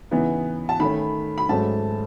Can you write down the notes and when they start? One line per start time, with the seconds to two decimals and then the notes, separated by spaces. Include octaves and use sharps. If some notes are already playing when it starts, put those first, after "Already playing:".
0.11 C#3 E3 B3 D#4
0.69 A5
0.80 D#3 A3 C#4 B5
1.38 B5
1.49 G#2 F#3 A3 C#4 A5